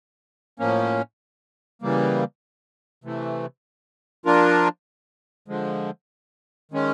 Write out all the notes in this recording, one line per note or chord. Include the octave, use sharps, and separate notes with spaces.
A2 F3 A#3 C#4
C#3 E3 G3 A#3
C3 E3 A3
F3 A#3 D4 F4 A#4
D3 F3 G#3
D#3 G#3 C#4